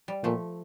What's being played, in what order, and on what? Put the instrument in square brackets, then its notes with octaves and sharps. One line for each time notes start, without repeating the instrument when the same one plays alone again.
[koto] G3
[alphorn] A#2 [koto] F3 A3